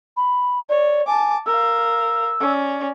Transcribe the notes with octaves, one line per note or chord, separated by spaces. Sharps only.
B5
C#5 D5
G#5 A5 D6
A#4 F5 E6
C#4 D5